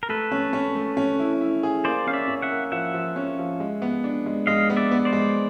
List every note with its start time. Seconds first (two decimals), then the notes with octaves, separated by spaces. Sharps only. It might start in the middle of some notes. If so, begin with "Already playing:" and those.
0.03 A#4
0.09 A3 A4 B4
0.32 C#4
0.53 C#4
0.75 A3
0.97 C#4
1.19 E4
1.41 E4
1.63 G#4
1.85 A#3 C5 D5
2.07 C#4 F5
2.13 D5 E5
2.28 C#4
2.42 E5 F#5
2.51 A#3
2.72 F3 E5 F#5
2.94 F3
3.16 C#4
3.39 F3
3.60 G#3
3.82 B3
4.04 D4
4.26 G#3
4.47 G#3 D#5 F5
4.70 B3
4.77 D5 E5
4.91 B3
5.05 C5 D5
5.13 G#3